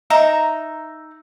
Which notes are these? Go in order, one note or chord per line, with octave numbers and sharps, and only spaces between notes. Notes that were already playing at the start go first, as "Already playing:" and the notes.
D#4 E5 A#5